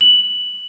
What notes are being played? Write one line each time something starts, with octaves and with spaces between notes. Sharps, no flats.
F#7